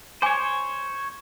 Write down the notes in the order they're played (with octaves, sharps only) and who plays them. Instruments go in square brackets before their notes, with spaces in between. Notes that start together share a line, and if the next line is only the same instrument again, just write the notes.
[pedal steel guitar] C5 C#5 [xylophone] G#5 D6